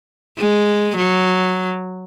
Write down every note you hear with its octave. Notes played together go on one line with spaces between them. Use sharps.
G#3
F#3